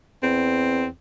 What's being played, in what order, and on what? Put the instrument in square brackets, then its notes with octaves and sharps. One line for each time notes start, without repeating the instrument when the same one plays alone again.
[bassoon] E2 [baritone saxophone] C4